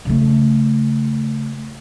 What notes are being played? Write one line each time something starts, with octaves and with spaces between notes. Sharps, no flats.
C#3 A3